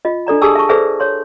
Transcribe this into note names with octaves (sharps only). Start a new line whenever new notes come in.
F4 D#5
D4 A4 D5 A#5
G4 G#4 G#5 A5 D#6 E6
E5 A5 C#6
G#4 A4 B4 C5 D5 E5
C#5 C6